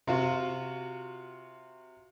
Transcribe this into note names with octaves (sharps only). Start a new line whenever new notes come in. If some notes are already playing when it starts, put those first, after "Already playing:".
C3 F4 F#4